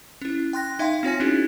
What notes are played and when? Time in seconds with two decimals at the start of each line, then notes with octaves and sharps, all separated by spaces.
0.22 C#4 E4
0.53 G5 C6 F#6 A#6
0.79 D#4 E5 F5 G5 C6
1.03 C4 F4 C#5 G#5
1.20 C#4 D#4 E4 F#4 G#4